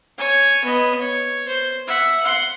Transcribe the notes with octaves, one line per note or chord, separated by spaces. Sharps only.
C#5 G#5
B3 D#5
C#5
C5
E5 F#5
F#5 C6